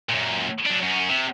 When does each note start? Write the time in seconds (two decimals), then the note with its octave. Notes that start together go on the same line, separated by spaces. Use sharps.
0.09 F#2 A#2
0.66 F#3 D4
0.83 F#2 C#4
1.09 C3